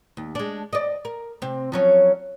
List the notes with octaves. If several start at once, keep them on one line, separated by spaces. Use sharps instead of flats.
D#2
G#3 D4
D5 D#5
A#4
C3 C4
F3 F#3 C#4